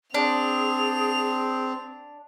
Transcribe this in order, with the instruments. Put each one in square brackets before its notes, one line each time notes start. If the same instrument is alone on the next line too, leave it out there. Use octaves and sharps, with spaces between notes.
[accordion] C4 [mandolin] D4 [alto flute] G#4 [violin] F7